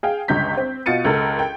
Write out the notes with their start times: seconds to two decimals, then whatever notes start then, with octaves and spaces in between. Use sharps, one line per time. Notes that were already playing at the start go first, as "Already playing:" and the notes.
0.03 G#4 F5 G5
0.28 G1 C#2 G#3 G6 B6
0.57 C4
0.86 B2 F4 A6 C#7 D#7
1.05 C#2 A4 A#4
1.39 G5